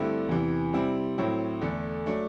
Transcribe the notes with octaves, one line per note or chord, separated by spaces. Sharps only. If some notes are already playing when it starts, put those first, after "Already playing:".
Already playing: G2 D3 A3 C4 E4
E2 C3 E3
C3 G3 C4 E4
A2 F#3 C4 E4
E2 D3 A3
F#3 A3 D4